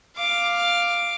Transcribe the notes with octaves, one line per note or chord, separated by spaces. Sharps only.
F5 D6